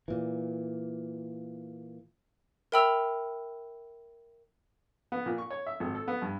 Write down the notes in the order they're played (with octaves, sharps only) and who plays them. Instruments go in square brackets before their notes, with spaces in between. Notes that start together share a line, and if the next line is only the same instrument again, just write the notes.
[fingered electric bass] A#2 E3
[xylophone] A#4 E5 G5 B5 E6 F7
[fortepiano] B3
A#2
C#6
C#5
E5
G#1
A4
B3
G2